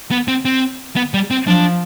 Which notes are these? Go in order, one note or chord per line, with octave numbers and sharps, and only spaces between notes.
B3
C4
C4
B3
G3
C4
F3 D4